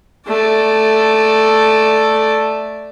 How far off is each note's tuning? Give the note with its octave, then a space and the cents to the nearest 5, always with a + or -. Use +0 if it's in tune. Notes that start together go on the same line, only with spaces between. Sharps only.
A3 +0 D5 +0